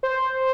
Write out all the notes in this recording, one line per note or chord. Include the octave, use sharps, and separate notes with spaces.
C5